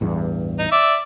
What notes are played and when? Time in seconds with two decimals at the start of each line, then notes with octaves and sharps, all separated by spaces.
0.01 A1 E2 G2
0.59 D#4
0.72 D5 E5